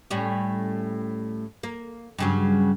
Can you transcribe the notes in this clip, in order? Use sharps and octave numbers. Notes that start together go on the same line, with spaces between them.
A2 G3 C#4
A#3
G2 C#3 F#3